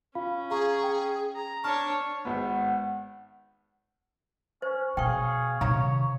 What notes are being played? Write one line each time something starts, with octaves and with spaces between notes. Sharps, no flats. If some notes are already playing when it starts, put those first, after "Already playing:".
C#4 F4 F5 B5
G#4 F5 A#5 C#6
G5
A#5
D4 C#5 A5 C#6 F6
G#1 B3 F#5
C#4 C5
B2 G#4 C#5 F5 G5 C#6
C3 D#3 C#5 F5 A#5 B5